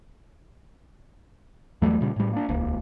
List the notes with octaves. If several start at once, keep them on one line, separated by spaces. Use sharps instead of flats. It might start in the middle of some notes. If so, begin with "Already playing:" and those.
E2 F#3 G3 A3
A#2 C#3 G3
A2 G3
A#3 D4
D#1 C#2 A#3